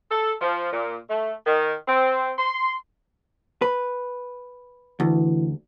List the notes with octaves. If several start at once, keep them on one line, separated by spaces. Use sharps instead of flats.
A4
F3
A#2
A3
D#3
C4
C6
B4
D2 E3